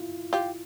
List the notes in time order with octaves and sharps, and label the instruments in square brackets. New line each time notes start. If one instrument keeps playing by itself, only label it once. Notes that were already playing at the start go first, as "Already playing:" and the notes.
Already playing: [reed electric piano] E4 F4
[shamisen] F4 G4